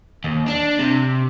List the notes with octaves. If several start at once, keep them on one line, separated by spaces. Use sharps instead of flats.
D#2
D4
C3